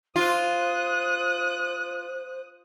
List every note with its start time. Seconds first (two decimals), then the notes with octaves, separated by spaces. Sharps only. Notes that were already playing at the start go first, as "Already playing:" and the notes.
0.16 F4 C5 D#6 F#6